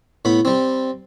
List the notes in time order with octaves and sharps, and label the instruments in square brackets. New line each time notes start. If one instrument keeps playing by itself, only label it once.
[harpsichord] A2 B3 B5
G3 C4